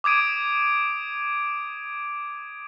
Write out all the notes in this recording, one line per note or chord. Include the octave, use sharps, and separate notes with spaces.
D6 D#6 G#6 D7 D#7